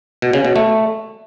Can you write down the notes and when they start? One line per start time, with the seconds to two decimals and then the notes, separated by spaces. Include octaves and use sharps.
0.22 B2
0.33 C#3
0.45 B2
0.56 A3